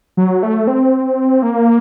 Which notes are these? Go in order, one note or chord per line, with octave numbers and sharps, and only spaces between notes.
F#3
A3
C4
A#3